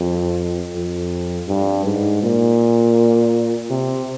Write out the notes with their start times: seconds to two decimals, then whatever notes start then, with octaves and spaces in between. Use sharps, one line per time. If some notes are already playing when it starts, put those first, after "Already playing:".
Already playing: F2
0.75 F2
1.48 G2
1.85 G#2
2.22 A#2
3.70 C3